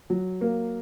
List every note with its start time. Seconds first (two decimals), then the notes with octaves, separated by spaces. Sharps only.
0.10 F#3
0.41 A#3